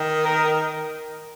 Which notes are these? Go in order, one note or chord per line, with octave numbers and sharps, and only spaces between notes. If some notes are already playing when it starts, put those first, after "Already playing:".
Already playing: D#3
A#4